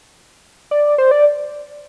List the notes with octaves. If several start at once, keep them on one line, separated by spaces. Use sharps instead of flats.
D5
C5
D5